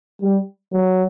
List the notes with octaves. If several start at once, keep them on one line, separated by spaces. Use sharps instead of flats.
G3
F#3